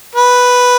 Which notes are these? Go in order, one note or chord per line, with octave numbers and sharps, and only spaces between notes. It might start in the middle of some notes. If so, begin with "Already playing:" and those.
B4